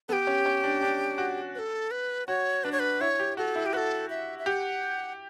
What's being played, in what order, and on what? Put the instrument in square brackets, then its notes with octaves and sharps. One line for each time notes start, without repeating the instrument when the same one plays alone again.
[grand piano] B3 [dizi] A4
[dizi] G4
[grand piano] C#4
C#4
D4
D4
F#4
[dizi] B4
A4
B4
[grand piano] F#4 [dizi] C#5
[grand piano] D4 [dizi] B4
[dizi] C#5
B4
[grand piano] E4 [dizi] C#5
[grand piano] G4
[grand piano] F#4 [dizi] A4
[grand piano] E4
[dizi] G4
[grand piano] F#4 [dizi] A4 B4
[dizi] E5
E5
[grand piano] G4 [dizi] F#5